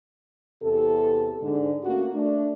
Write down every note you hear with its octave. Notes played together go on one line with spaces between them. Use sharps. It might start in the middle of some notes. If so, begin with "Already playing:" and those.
E2 C3 G4 A4
G#2 D3
A3 A#3 C#4 F#4
A3 D4